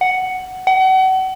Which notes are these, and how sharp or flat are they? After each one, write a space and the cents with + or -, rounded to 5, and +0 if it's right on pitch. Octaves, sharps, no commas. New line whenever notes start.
F#5 +5
F#5 +35